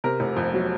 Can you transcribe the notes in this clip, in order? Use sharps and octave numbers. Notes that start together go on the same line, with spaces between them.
C3 A#4
F1
F2
F#3